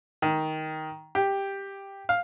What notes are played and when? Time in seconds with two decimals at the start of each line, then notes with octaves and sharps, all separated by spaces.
0.22 D#3
1.15 G4
2.09 F5